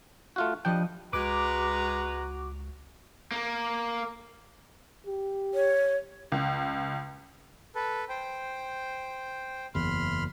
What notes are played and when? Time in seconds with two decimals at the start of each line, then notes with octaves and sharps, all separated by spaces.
0.36 A3 F4 F#4
0.65 F3 G3 D4 D#5 G5
1.13 C#2 G#3 F#4 B4 A#5 D6
3.32 A#3
5.07 G4
5.54 C#5
6.32 C#2
7.75 A4 B4
8.09 C5 G5
9.75 F#1 E2 B5 C6 F6